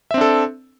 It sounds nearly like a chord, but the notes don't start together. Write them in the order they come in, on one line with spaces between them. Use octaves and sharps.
E5 C4 D4 A4